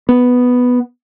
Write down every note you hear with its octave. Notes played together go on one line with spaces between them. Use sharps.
B3